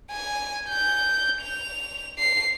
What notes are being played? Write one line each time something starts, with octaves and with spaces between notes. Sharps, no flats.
G#5
G6
F7
C7